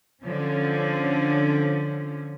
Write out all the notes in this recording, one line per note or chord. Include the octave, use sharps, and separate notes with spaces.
D3 F3 C#4